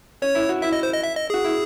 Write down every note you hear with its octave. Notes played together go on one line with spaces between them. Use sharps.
C#4 C#5
E4
F#4
E4 E5
D#5
C5
D#5
E5
D#5
F#4 G#4
E4